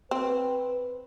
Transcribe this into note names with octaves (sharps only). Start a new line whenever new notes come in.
C4 B4